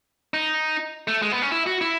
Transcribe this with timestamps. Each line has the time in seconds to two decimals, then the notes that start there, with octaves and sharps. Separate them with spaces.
0.34 D#4
1.08 A3
1.22 G#3
1.32 B3
1.42 C#4
1.52 E4
1.66 F#4
1.81 E4